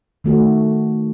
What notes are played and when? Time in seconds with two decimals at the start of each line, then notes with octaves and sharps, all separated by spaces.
0.24 D#3 A3 F#4